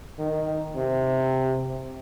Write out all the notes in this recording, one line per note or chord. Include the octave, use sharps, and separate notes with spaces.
D#3
C3